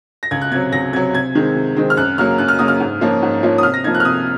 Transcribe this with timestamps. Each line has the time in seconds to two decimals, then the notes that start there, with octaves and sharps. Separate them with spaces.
0.23 A#6
0.31 C#2 G#6
0.42 F#6
0.52 C3 F#3 G#6
0.72 C#2 A#6
0.93 C3 F#3 G#6
1.14 C3 G#6
1.35 D#3 G#3 C4
1.56 C3
1.76 D#3 G#3 C4
1.90 F6
1.97 F#2 F#6
2.18 C#3 F#3 A#3 F6
2.38 F#2 F#6
2.48 F6
2.59 C#3 F#3 A#3 D#6
2.68 F6
2.80 G#2
3.01 F3 A#3 C#4 F4
3.22 G#2
3.43 F3 A#3 C#4 F4
3.58 D#6
3.63 C3 F6
3.74 A#6
3.84 F3 A#3 D#4 G#6
3.95 F#6
4.00 F6
4.05 C3 D#6